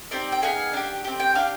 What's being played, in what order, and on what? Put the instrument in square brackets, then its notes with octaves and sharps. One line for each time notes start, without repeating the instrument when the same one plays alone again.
[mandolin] C4 D#4 G4 D5
G5
B3 D#4 G#4 F5
D4 G4
C4 G4
G5
D4 G4 F5